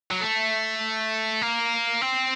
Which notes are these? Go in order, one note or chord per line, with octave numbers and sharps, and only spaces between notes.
F#3
A3
A#3
C4